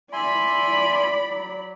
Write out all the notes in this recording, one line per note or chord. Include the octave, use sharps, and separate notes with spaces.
D5 E5 G#5 B5 C6
F#3